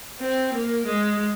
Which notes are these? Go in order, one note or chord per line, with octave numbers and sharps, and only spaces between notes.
C4
A#3
G#3